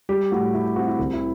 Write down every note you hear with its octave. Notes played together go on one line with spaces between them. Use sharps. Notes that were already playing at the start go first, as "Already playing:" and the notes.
G3 G4
A2 F#4
E4
C4 F#4
E4
C2
E4